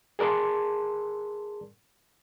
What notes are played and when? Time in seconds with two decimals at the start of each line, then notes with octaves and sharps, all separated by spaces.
0.19 G#4 A#4 D5 A5 C6